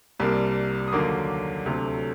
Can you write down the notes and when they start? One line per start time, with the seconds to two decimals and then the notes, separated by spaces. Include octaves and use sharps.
0.19 C2 C3 G3 A#3
0.88 D#6
0.92 D#2 D3 F#3 A#3 D6
1.66 D2 C3 F#3 A3